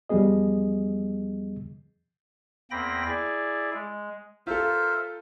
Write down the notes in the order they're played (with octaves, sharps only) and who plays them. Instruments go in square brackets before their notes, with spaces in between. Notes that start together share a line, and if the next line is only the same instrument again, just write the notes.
[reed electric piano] E2 F3 G3 B3 G#4 D#5
[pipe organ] E2 A#3 C4 G5 B5 A#6
E4 G#4 D5
G#3
[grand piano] F4 A4 [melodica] A#4 C5 E5